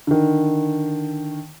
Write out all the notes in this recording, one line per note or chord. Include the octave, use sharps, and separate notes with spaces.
D3 D#3